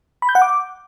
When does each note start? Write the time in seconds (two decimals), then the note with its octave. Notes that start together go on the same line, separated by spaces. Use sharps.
0.22 B5
0.29 G6
0.35 F#5
0.42 D6